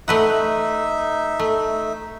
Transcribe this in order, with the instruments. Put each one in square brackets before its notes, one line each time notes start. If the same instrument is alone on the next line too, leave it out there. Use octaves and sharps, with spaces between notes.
[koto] A3 B4 F#5 [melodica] D#4 E5
[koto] A3